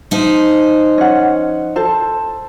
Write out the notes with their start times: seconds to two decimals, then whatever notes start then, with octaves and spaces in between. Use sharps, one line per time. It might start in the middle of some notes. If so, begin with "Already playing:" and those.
0.11 F3 D#4 C5
0.98 C#4 F#5
1.76 A4 C5 A5